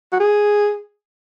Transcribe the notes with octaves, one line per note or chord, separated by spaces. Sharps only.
F#4
G#4